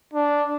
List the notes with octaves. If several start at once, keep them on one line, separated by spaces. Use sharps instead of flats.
D4